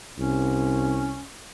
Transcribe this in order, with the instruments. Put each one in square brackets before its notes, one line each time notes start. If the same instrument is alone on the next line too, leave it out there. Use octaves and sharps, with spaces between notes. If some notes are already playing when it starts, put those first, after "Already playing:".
[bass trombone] C2 [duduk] C#4